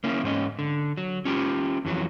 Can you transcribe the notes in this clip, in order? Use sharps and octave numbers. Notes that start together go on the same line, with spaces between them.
A#3 C#4 E4
G#2 C#4 D#5
D3
F#3
C#4 F4 G4
F2 E3 F#3